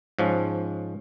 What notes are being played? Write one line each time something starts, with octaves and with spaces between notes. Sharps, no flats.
G#2 F3 C#4